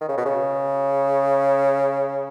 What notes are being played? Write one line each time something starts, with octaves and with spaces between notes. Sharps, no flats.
D#3
C#3
B2
C#3